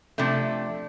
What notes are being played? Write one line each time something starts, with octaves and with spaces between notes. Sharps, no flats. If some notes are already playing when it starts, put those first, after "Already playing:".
C3 F3 A3 D4